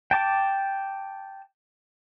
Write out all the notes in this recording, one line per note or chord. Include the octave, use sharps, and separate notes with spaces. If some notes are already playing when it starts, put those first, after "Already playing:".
G5 A5 D6